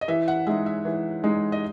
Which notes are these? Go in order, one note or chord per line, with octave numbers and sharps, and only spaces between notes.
D#5
E3 E5
F#5
G#3 D#4 E5
E5
E3
G#3 D#4
D#5